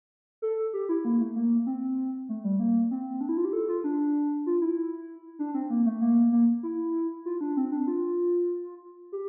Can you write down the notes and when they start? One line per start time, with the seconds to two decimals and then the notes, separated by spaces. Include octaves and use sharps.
0.42 A4
0.74 G4
0.89 E4
1.05 A#3
1.21 A3
1.36 A#3
1.66 C4
2.29 A3
2.44 G3
2.60 A#3
2.91 C4
3.21 D4
3.29 E4
3.37 F4
3.45 G4
3.53 A4
3.68 F4
3.84 D4
4.46 F4
4.61 E4
5.39 D4
5.54 C4
5.70 A#3
5.86 A3
6.01 A#3
6.32 A#3
6.63 E4
7.26 F4
7.41 D4
7.57 C4
7.72 D4
7.87 F4
9.12 G4